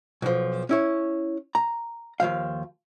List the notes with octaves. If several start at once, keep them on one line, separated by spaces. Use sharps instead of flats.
B1 F3
C#4 E4 C#5
A#5
D#2 A#2 F3 F5